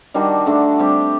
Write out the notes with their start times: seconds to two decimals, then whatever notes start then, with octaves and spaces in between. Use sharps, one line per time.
0.14 D#3 G3 D4 F#4
0.46 D3 A3 D4
0.79 G3 C4 G4